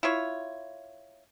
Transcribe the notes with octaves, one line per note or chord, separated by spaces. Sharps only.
E4 F4 C#5